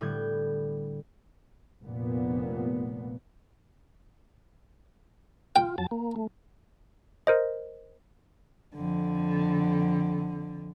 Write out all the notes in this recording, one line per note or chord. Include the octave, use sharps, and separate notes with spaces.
A2 D3 G3 B3 G6 G#6
F1 A#2 B3
F4 G5
F2 F#3 A5
A#3
A3
A#4 C5 D#5
F2 D3